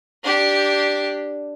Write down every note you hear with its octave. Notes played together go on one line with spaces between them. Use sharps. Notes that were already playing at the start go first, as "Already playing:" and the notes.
D4 G4